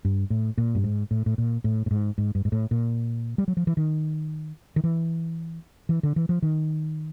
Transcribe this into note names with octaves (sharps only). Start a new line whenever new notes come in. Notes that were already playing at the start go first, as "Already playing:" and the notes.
G2
A2
A#2
G2
G#2
A2
A2
A#2
A2
A2
G#2
G#2
G2
G#2
A2
A#2
G3
F#3
F3
E3
D#3
D#3
E3
E3
D3
E3
F3
D#3